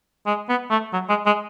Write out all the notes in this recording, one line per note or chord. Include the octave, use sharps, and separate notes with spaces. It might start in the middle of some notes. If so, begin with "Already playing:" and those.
G#3
B3
A3
F#3
G#3
G#3